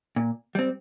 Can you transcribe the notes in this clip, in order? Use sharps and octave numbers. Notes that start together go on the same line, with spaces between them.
A#2
G3 C4